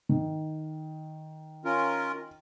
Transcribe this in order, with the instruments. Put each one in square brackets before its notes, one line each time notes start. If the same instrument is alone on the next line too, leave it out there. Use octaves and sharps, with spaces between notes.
[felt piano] D#3
[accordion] C#4 F4 A#4